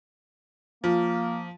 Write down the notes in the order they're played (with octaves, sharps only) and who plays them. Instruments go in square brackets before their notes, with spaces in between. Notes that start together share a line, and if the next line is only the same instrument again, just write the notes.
[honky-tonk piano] F3 [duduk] A#3